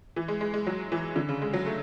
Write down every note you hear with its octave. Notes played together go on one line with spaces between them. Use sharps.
E3
G#3
G#3
G#3
F#3
E3
D3
C#3
G#3
F#3
A3